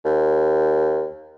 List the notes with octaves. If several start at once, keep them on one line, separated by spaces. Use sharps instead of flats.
D#2